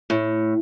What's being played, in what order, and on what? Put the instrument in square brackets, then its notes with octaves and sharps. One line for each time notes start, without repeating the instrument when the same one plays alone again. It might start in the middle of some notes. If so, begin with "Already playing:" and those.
[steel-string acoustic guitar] A2